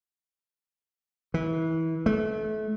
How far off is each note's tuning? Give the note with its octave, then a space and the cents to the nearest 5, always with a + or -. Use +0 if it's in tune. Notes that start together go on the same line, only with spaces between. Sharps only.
E3 -25
A3 -30